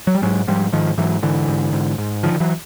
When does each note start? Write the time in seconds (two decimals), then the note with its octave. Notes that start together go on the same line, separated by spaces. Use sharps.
0.07 F#3
0.15 G3
0.22 G#2 F#3 G#3
0.48 G#2 F3 G3
0.72 G#2 D#3 F3
0.97 G#2 E3 F#3
1.22 G#2 D3 E3
1.48 G#2
1.73 G#2
1.98 G#2
2.23 D3 D#3 F3
2.40 E3 F#3